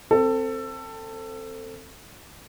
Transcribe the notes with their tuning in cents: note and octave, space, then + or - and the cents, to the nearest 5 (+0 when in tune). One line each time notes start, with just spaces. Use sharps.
C4 +0 A4 +20